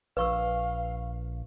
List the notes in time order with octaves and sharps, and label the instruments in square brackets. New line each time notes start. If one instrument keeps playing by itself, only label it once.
[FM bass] A#1 [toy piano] B4 C#6 E6 [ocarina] F5